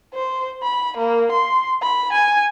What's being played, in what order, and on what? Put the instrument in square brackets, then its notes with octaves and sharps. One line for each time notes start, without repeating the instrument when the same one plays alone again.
[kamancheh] C5
B5
A#3
C6
B5
G#5